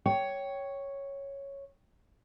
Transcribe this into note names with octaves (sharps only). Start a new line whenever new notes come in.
C#5 G5